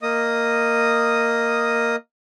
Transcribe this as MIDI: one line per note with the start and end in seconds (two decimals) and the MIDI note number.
0.02 1.96 58
0.02 1.96 75
0.02 1.96 87